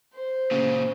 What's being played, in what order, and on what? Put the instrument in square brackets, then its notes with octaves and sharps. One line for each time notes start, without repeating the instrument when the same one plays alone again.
[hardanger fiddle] C5
[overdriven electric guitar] A#2 C#3